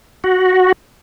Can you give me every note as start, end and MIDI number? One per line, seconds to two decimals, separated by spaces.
0.24 0.72 66